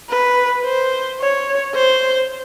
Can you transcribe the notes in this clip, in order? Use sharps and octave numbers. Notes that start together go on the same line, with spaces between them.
B4
C5
C#5
C5